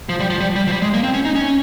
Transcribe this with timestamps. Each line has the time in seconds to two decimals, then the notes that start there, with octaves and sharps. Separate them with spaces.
0.09 F3
0.20 G3
0.30 F3
0.41 G3
0.56 G3
0.67 F3
0.72 G3
0.82 G#3
0.94 A#3
1.04 C4
1.14 C#4
1.25 D#4
1.36 C#4